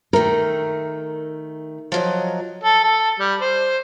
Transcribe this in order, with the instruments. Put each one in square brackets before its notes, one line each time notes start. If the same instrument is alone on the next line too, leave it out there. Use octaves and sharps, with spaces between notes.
[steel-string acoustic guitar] D#3 A3 [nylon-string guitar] A#4
[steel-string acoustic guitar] F3 F#3 D#5
[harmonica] A4
A4
G3
C5